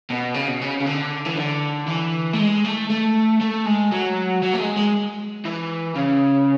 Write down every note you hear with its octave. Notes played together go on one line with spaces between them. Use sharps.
B2
C#3
B2
C#3
C#3
D3
E3
D3
E3
A3
G#3
A3
A3
A3
G#3
F#3
F#3
A3
G#3
G#3
E3
C#3